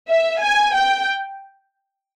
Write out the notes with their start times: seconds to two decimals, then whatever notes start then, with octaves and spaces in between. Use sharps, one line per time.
0.09 E5
0.41 G#5
0.75 G5